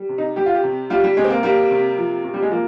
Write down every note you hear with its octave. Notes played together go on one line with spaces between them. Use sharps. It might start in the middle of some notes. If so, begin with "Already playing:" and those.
Already playing: G3
C3
D#4
G3 G4
F4
G4
C3
G3 F4
G3
C3 G#3
C4
A#3
G3 A#3
C3
F3
C3
G3
G#3
F3 A#3